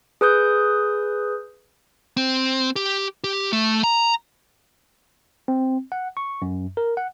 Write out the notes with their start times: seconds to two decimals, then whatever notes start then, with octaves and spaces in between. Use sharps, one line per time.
0.21 G#4 B4 D#6 G6
2.17 C4
2.76 G4
3.24 G4
3.53 A3
3.84 A#5
5.48 C4
5.92 F#5
6.17 C#6
6.42 F#2
6.77 A#4
6.97 F#5